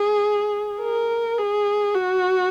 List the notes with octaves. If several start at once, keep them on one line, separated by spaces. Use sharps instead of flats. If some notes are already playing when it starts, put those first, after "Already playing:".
Already playing: G#4
A#4
G#4
F#4